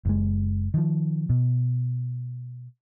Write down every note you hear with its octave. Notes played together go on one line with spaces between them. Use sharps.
F#1 G#3
D#3 F3
B2